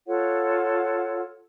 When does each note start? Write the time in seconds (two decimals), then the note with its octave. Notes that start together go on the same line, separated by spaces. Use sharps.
0.06 F4 A4 C#5 F#5